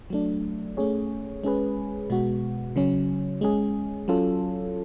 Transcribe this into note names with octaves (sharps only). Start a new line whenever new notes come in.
F#3 A3 D4
A3 C#4 G#4 C#5
G#3 C#4 G#4 B4
B2 G#3 B3 F#4
C#3 F#3 C#4
G#3 C#4 G#4
F#3 C#4 F4 A4